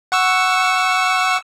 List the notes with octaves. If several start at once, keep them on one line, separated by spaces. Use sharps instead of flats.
F#5 C#6 E6